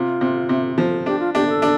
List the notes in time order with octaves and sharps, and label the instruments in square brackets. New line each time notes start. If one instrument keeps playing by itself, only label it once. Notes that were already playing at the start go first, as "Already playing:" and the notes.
Already playing: [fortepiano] C3 [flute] F4
[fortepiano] C3
C3
F3
[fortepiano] D4 [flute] G4
[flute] F4
[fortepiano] D4 [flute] G4
[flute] A4
[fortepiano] D4